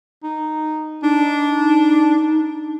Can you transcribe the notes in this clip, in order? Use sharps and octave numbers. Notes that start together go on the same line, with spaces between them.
D#4
D4 D#4